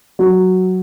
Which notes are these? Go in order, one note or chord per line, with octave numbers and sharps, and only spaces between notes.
F#3